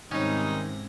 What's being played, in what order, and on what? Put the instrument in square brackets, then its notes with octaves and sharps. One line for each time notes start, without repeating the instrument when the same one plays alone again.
[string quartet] G#2 C3 A#6 [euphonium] D#3 [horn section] G3 C4 D#4 [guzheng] C#4